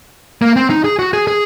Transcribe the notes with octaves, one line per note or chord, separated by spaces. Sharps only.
A#3
C4
D#4
G#4
F#4
G#4
G#4